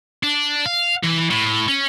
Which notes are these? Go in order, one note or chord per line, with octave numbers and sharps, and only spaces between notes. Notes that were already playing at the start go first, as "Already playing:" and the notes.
D4
F5
E3
A2
C#4